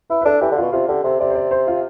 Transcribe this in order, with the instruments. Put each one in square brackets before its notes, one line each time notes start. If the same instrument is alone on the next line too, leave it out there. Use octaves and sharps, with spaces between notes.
[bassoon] E4 [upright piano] B4
[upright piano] B4
[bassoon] D4 [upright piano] A4
[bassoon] E3 [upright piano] G4
[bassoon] D3
[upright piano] F4
[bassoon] B2
[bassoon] C3 [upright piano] F4
[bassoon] D3 [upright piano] G4
[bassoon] C3 [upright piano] A4
[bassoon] C3 [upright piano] D5
[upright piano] C5
D5
C5
F4